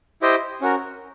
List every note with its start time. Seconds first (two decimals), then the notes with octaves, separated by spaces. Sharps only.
0.22 E4 G4 C5 D#5 G5
0.61 C#4 F#4 A#4